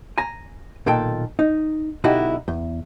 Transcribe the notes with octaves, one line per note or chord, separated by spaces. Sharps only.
G#5 A#5
B1 A#2 D#3 A4 G5
D#4
B1 D3 D#4 E4 F#4 G4
E2